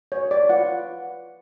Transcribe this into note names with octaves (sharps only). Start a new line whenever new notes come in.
C#5
D5
F4 B4 F#5